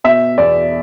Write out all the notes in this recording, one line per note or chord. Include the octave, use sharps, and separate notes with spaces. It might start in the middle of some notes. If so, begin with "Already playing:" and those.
B2 E5
E2 D5